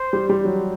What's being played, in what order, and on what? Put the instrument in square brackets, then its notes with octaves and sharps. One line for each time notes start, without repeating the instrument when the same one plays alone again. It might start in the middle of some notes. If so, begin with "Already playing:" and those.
Already playing: [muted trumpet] C5
[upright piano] G3
G3
F#3